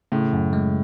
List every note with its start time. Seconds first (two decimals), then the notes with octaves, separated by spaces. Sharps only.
0.12 A2 C#3
0.33 F#2
0.53 G#3